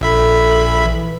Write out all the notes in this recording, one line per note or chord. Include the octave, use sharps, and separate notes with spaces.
A#1 A4 E5 B5
E3